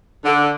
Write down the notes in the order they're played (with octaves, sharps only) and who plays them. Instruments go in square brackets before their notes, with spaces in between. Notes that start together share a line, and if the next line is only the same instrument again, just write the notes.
[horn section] D3